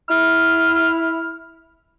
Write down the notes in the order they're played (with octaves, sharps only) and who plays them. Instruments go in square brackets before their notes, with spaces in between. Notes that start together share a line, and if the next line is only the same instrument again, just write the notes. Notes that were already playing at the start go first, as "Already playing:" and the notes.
[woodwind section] E4 F6